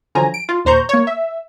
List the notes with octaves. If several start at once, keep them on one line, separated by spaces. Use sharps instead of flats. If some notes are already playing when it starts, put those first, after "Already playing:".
D3 F3 F#3 G#5 A#5
D7
F4
D#2 A#2 C5 A#5 C#6 G6
A#3 C#5
E5